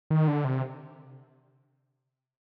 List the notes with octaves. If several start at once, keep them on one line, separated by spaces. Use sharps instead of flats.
D#3
D3
C3